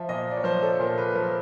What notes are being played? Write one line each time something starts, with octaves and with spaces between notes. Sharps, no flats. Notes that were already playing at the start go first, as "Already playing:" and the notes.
Already playing: F3 E5
A#2 D#5
D5
C#5
F3 C5
A4
A#2 A#4
B4
F3 A#4